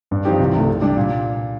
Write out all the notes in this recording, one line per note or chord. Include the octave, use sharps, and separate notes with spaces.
G2
F3 C4 D#4 G4
C2
C3 D#3 A3
C3
G3 D4 G4
A#2